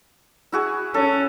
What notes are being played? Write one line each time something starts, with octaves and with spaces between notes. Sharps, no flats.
E4 F#4 G#4
C#4 A4